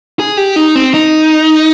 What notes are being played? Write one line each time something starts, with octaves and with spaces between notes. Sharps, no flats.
G#4
G4
D#4
C4
D#4